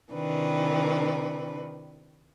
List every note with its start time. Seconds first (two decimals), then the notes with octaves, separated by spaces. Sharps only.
0.11 C3 D#3 E3 D4 B4